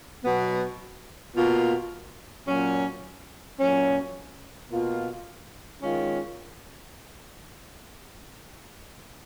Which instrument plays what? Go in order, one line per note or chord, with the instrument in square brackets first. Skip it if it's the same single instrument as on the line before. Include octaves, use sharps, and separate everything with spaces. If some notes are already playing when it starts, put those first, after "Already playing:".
[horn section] B2 F#3 B3
B2 A#3 F4
A#2 F#3 C#4
A#2 F#3 C#4
B2 A#3 F4
D#3 G#3 C#4 F4